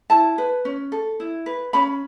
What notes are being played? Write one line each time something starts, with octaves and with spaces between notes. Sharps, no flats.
E4 A5
B4
C#4
A4
E4
B4
C#4 B5